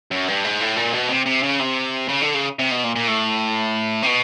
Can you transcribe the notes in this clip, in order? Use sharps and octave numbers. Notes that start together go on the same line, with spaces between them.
F#2
G2
G#2
A2
A#2
B2
C3
C3
C#3
C3
C#3
D3
C#3
C3
B2
A#2
A#2
A2
C3
B2